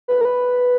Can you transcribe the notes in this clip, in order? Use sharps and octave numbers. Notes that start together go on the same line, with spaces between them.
B4
A#4
B4